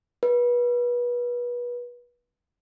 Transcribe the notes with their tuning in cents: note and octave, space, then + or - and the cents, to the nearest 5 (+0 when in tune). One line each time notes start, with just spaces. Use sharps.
B4 -30